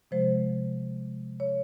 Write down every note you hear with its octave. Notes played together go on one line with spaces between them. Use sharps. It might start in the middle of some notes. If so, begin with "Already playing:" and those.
C3 F3 G#3 C5
C#5